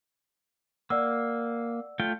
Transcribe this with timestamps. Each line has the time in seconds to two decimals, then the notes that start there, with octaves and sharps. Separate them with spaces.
0.90 A#3 D5 F#5 E6
2.00 A3 F4 G5